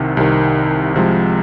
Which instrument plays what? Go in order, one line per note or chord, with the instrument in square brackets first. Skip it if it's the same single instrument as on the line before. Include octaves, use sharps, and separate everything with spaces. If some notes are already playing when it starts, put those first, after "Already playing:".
Already playing: [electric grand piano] C2 C3 D#3
C2 C3 D#3
C2 C3 F3 G#3